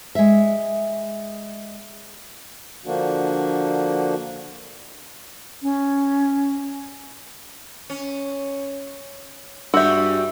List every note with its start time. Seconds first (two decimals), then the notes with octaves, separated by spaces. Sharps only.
0.15 G#3 E5
2.86 D3 F3 A#3 D4 F#4
5.62 C#4
7.90 C#4
9.74 G2 G3 G#3 F#4 E5 E6 G6